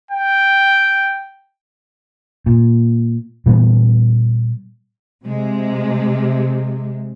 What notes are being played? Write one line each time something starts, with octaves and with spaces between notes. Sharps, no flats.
G5
A#2
A#2 E3 G3 B3
C3 G#3